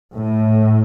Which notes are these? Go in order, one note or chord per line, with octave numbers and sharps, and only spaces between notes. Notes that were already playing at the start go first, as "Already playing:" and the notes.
A2